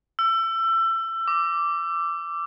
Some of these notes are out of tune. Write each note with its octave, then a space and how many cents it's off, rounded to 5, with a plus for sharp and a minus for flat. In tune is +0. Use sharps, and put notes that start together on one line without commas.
E6 +25
D6 -5